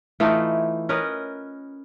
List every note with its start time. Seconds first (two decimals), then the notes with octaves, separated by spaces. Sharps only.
0.20 E3 A3 D#4 F4
0.89 C#4 A#4 B4 D#5